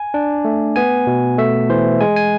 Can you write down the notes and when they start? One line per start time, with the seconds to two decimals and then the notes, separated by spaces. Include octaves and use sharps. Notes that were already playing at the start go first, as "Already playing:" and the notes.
Already playing: G#5
0.14 D4
0.45 A3
0.76 B3 G#5
1.07 B2
1.38 A3 E5
1.69 E3 C5
2.01 G#3 G#5
2.16 G#5